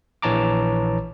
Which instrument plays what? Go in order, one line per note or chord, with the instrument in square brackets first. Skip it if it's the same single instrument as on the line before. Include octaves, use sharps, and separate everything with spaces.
[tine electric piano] A#1 E3 C#5 A5 A#5 D6